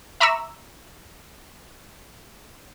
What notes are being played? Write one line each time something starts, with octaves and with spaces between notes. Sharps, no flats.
E5 A#5 B5 C#6 D6 E6